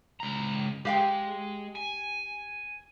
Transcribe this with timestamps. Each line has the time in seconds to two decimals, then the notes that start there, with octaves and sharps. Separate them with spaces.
0.20 C#2 A#5
0.85 G#3 G4 F5 G5
1.76 G#5